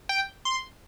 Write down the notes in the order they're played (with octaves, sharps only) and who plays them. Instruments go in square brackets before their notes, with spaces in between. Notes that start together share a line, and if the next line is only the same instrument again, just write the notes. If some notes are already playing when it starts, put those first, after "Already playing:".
[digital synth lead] G5
C6